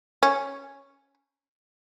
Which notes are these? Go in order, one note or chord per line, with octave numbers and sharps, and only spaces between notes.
C#4